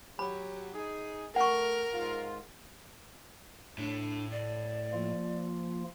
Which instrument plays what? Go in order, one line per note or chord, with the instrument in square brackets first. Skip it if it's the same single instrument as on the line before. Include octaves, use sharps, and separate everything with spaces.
[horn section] F#3 G4 [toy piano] B5
[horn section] D#4 G#4
[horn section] A3 [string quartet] A#4 [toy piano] F#5 C#6
[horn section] G#2 F4
[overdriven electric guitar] A2 [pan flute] D4
[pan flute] D5
[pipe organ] F3 A#3 F4